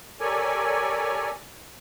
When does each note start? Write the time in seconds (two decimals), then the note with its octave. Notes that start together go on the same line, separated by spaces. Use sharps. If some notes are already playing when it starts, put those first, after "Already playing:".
0.20 G4 A4 A#4 C#5 D5 G#5